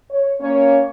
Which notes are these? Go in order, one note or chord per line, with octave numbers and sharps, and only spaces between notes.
C#5
A#3 C#4 C#5